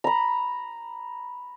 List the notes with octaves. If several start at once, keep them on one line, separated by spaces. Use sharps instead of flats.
A#5 B5